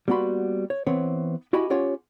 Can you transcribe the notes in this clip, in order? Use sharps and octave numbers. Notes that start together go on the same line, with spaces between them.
G3 A#3 B3 F#4 B5 C6
C#5
E3 B3 C4 B4 C#5
E4 F#4 G4 D#5 G#5 B5
C#4 F4 G4 C#5 F#5